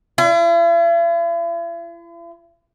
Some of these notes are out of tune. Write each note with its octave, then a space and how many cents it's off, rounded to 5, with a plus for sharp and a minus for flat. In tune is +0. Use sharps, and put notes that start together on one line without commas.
E4 +45